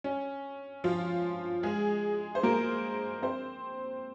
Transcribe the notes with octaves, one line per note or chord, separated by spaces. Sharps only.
C#4
F3 F4
G#3 G#4
C5
A#3 A#4
C4 C5